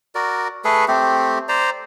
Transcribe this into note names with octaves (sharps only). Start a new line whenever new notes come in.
F#4 A#4 D5
A3 G#4 A4 B4
A3 C4 G4
C5 D5 A#5